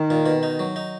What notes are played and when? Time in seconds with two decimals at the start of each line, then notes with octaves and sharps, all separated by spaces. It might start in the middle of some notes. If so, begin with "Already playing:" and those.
Already playing: D#3
0.10 A#2
0.26 B2
0.43 D#4
0.59 F#3
0.76 D#4